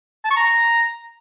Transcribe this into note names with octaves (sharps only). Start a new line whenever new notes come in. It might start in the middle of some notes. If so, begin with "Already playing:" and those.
A5
C#6
A#5